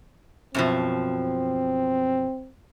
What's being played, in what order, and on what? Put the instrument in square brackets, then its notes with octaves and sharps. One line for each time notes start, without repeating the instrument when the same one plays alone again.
[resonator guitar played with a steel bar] F#2 B2 F3 [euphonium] C4